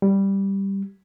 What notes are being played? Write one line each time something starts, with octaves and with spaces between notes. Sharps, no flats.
G3